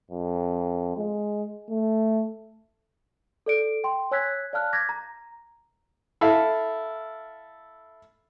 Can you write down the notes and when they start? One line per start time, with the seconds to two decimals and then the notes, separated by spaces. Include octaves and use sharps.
0.11 F2
0.97 G#3
1.70 A3
3.46 A4 D5 D7
3.84 G5 C6
4.11 C#5 G#5 E6 F#6 G#6 B6
4.53 D5 F5 A5 F6 F#6
4.73 D6 G6 G#6 A#6 B6
4.89 A#5
6.21 E4 A4 F5